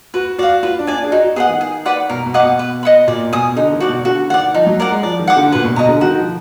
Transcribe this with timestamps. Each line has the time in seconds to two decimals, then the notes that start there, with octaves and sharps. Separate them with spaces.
0.14 F#4 B4
0.39 F#4 D5 F5
0.63 F4 B4
0.79 D4
0.87 D5 G#5
0.96 D4
1.04 G#4
1.11 D#4 F#4
1.24 F#4
1.36 B3 G#4 D#5 F#5
1.48 D#3
1.61 G#4
1.85 B4 D5 F#5
2.10 B2 A#4
2.26 B2
2.34 D#5 F#5 D6
2.43 B2
2.59 B4
2.83 D#5 F#5 B5
3.07 A#2 D5
3.32 B2 G#5 D#6
3.56 D3 D#4
3.73 D#3
3.80 F#4 D5
3.89 B2
4.05 D3 F#4
4.30 D#3 D5 F#5
4.54 F3 D#4
4.66 F#3
4.80 A#4 D5 F#5
4.91 G#3
5.03 F3 D5
5.19 D#3
5.27 F#5 D6
5.37 D3
5.52 A#2 B4
5.64 B2
5.76 B2 D#5 A#5
5.89 D3
6.01 D#3 F#4
6.18 F3